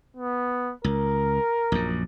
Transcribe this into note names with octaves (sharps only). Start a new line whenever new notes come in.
B3
C#2 A#4
A#1 F#2